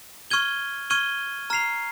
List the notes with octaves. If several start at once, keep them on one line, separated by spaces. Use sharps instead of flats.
C#6 F6 G#6 D#7 G7
C#6 F6 G#6 D#7 G7
A#5 F6 C7 F7